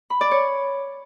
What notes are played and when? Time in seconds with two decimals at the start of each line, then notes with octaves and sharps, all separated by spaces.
0.10 B5
0.21 D5
0.31 C#5